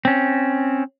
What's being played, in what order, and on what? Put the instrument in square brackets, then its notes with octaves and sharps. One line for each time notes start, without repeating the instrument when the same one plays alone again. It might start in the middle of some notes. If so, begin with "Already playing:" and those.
[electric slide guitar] C4 C#4